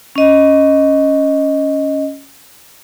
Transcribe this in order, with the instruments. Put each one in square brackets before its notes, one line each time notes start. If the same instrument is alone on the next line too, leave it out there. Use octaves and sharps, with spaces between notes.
[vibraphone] C#4 D#5